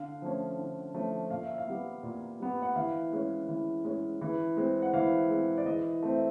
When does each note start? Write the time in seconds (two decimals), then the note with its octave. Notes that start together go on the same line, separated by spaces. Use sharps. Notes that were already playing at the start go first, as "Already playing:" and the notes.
Already playing: D3 F5
0.22 F3 A3 C#4
0.58 D3
0.94 F3 A3 C#4
1.31 A#2 F5
1.45 E5
1.58 F5
1.67 G3 B3
2.03 A#2
2.40 G3 B3
2.62 F#5
2.76 E3 F5
3.13 G#3 C#4
3.48 E3
3.85 G#3 C#4
4.21 E3
4.57 G#3 C4
4.82 F#5
4.94 E3 F5
5.30 G#3 C4
5.58 D5
5.66 E3 D#5
6.03 A3 C4
6.14 E5